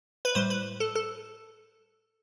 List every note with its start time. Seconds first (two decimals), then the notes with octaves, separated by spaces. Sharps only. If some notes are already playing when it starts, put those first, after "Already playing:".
0.25 B4
0.35 A2 G3 C5
0.50 B4
0.80 A4
0.95 A4